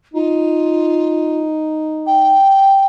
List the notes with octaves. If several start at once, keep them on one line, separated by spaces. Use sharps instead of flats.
D#4 F4
G5